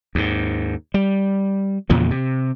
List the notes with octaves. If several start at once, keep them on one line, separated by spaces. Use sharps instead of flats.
D#2 G#2
G3
E2 A#2 C#3 F3
C3